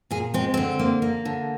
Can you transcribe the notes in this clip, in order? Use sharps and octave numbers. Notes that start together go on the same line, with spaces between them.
A#2 G#4
G#3 C4
D3 C4
A#3
A#3
D3